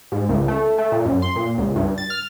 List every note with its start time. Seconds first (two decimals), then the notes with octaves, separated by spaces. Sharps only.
0.12 G#2
0.29 C#2
0.48 A3
0.78 A3
0.92 A#2
1.05 F#2
1.22 C6
1.36 A#2
1.58 C#2
1.76 G2
1.98 A6
2.10 F6